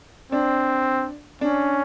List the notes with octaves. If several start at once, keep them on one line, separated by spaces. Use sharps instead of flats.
C4 D4
C#4 D4